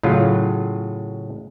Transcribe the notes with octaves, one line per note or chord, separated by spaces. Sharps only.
A2 C#3 F#3 F4